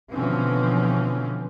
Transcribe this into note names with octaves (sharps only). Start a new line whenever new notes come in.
B2 D3 E3 F3 C4 C#4